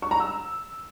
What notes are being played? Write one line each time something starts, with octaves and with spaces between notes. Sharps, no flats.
C#6
A#5
E6